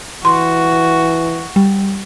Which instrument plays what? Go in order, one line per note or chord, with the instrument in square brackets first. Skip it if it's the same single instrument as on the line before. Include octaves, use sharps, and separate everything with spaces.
[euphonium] E3 [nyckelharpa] F#4 [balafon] C6
[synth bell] G3